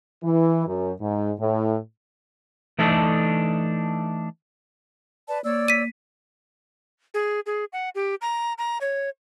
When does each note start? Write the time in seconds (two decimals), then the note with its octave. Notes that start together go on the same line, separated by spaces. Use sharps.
0.24 E3
0.67 F#2
1.01 G#2
1.40 A2
2.79 E3 A3 D4 D#4 A4
5.28 B4 D5 A5
5.44 A#3 C#5 D5 E6
5.68 B6 D#7
7.14 G#4
7.46 G#4
7.73 F#5
7.95 G4
8.22 A#5
8.58 A#5
8.81 C#5